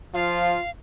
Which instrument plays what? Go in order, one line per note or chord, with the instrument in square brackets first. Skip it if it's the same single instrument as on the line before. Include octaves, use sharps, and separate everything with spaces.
[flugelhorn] F3 [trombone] F4 [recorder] F5